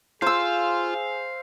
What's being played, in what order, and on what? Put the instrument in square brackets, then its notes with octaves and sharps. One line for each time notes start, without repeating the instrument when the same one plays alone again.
[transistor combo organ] F4 [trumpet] G#4 [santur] C5 E6 [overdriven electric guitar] F5